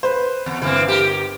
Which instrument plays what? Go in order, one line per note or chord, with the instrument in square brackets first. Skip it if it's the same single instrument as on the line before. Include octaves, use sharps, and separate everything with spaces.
[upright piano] B4 C5
[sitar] E2
[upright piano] G1 [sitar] E3 A#3 C4
[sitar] G4 A#4